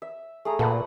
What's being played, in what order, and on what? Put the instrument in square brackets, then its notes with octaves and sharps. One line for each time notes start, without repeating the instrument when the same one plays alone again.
[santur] E5
A3 G#4 A#5
[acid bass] A#2 [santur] A3 B4 F#5